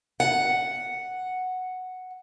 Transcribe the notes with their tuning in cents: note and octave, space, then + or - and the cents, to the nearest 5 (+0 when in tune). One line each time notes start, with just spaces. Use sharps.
F#5 +0